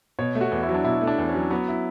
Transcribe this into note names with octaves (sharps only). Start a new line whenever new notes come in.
B2 C#5
A3
F#4
E2
E4
F#3
D4
B2 E4
A3
D4
E2
C#4
F#3
F#3 B3
E4